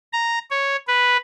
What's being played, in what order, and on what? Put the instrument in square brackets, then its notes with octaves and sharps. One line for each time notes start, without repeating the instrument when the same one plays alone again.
[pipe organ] A#5
C#5
B4